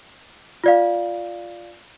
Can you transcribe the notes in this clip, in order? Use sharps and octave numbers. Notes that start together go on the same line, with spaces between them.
F4 D5 F5